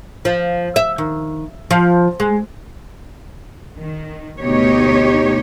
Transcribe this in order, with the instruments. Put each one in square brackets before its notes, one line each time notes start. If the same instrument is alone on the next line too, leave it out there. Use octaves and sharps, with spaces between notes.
[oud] F3
E5
D#3
F3
G#3
[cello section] D#3
D2 B2 D#4 G4 C#5